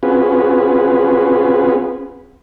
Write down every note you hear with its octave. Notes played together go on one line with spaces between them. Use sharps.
C4 C#4 F4 F#4 G#4 B4